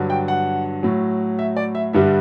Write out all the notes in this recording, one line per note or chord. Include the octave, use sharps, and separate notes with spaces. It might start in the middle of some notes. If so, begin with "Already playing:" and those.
Already playing: G2 D3 F#3
G5
F#5
A2 F#3
E5
D5
E5
G2 D3 G3 E5